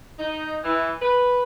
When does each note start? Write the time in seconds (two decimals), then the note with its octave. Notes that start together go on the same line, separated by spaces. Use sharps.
0.19 D#4
0.64 E3
1.02 B4